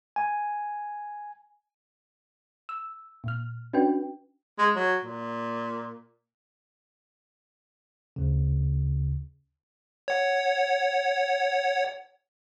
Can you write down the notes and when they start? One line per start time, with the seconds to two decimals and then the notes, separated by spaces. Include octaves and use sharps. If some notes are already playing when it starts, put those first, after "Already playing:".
0.16 G#5
2.69 E6
3.24 A#2 F6
3.73 C#4 D4 F#4 B4 G5
4.58 G#3
4.76 F#3
5.04 A#2
8.16 D2 C#3
10.08 C#5 F#5